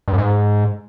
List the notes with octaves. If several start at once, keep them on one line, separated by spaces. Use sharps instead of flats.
G2
F#2
G#2